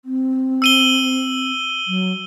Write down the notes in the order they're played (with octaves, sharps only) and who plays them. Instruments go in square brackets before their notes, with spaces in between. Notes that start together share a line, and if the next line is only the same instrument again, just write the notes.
[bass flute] C4
[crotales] E6 D#7 G7
[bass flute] F#3